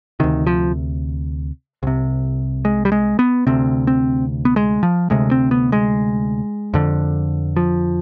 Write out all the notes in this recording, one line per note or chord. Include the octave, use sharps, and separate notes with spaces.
D2 C3 D#3
F3
C2 C3
G#3
G3
G#3
B3
D2 C3 C4
C4
B3
G#3
F3
D2 C3 G#3
C4
B3
G#3
F2 D3
F3